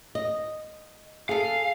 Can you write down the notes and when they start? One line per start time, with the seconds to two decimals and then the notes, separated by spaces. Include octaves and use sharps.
0.15 D#5
1.29 G#4 A4 F5